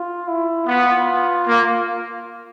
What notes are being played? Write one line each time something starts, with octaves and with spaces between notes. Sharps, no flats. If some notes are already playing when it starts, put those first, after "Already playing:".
Already playing: F4
E4
B3 F4
A#3